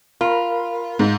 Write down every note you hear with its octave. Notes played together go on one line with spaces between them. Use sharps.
F4 A#4 B5
G#2